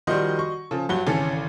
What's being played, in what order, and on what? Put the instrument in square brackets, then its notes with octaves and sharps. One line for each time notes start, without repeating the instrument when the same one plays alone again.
[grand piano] D#3 F3 G3 [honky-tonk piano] F#4 D#5 C6
[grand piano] C#6
[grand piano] C#3 F3 [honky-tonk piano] A4
[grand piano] G2 F#3 G7 [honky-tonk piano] F#5
[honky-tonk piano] G#1 C#3 E3 [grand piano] C#4 A4